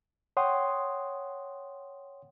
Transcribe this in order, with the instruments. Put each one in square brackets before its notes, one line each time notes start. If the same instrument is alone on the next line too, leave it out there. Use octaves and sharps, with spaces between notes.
[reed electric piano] C#5 F#5 G5 C6 D#6